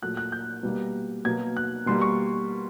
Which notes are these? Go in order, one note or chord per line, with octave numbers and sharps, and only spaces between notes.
A#2 F#3 A3 F#6
F#6
G6
B2 G3 A#3
B2 F#3 A#3 G#6
F#6
B2 G3 A#3 C6
C#6